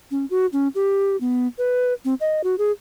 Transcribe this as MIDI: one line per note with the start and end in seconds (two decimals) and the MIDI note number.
0.11 0.25 61
0.30 0.46 66
0.53 0.68 61
0.75 1.16 67
1.21 1.47 59
1.58 1.93 71
2.05 2.14 60
2.21 2.42 75
2.44 2.55 66
2.58 2.71 68